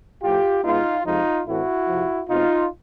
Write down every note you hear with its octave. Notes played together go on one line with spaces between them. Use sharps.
A2 F3 A3 F4 G4
B2 G#3 B3 D#4 F4
F2 C3 F3 G#3 D#4 F4
A2 E3 A3 C4 E4 F#4
F2 C3 F3
B2 G#3 C4 D#4 F4